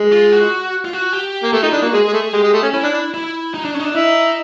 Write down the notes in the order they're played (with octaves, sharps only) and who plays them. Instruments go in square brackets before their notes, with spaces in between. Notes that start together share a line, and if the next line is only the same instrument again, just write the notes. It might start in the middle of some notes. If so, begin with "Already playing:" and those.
Already playing: [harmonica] G#3
[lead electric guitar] F4
F#4
F4
F#4
G4
[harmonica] A#3
[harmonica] A3 [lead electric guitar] G4
[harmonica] D#4 [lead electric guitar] F4
[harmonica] D4 [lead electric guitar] E4
[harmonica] A#3 [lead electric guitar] F#4
[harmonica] G#3 [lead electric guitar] G#4
[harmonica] G#3
A3
[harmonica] G#3 [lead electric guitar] G4
[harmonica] G#3
A3
C#4
[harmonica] C#4 [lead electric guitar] E4
[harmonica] D4
D4
[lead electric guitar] E4
D#4
D4
C#4
D#4
D4
[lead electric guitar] D#4 [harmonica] E4